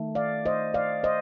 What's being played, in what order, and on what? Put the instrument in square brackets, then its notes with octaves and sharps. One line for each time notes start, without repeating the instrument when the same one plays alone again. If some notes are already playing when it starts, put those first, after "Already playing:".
Already playing: [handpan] D#3 A3
D5 F5
C5 D#5
D5 F5
C5 D#5